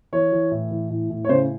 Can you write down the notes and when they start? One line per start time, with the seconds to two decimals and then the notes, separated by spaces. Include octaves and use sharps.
0.12 E3 C#5
0.32 E3
0.51 A2
0.71 E3
0.90 A2
1.10 A2
1.25 C#5
1.29 C#3 C5